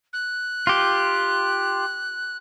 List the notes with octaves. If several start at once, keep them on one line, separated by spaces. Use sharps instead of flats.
F#6
F4 G4